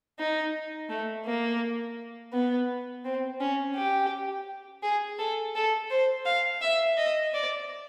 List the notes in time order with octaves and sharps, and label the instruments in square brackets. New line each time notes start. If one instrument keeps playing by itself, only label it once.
[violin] D#4
A3
A#3
B3
C4
C#4
G4
G#4
A4
A4
C5
F5
E5
D#5
D5